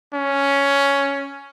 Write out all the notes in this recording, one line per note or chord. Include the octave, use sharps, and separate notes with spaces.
C#4